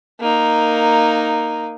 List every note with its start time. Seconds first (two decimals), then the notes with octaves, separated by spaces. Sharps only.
0.20 A#3 D#4